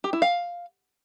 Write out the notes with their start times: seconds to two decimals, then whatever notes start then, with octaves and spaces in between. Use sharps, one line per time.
0.04 G4
0.13 E4
0.22 F5